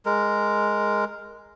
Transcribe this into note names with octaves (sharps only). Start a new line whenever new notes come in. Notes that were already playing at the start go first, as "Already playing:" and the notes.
G#3 A#4